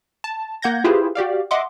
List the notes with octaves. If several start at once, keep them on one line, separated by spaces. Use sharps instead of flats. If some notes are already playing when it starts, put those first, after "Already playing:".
A5
A#3 F#5 G6 G#6 A#6
E4 F4 G4 G#4 B4 C5
F#4 G4 D5 F5
D#5 E5 F#5 C6 D6